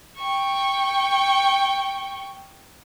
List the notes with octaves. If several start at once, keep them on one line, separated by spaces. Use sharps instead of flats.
G5 C#6